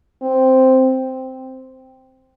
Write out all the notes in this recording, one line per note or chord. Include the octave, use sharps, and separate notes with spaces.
C4